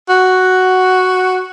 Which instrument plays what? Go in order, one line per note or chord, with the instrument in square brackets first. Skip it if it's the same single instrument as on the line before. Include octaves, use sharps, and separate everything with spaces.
[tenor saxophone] F#4